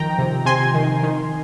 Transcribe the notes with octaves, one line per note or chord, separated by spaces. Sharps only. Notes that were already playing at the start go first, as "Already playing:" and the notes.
Already playing: D#3 F3 G5 A#5
C3
C3 G#5 C6
D#3
D#3